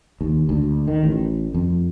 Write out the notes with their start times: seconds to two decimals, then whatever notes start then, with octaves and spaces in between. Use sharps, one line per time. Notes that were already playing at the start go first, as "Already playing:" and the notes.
0.21 D#2
0.49 D2
0.88 D#3
1.03 A1
1.55 F2